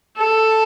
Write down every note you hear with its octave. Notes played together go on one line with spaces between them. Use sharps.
A4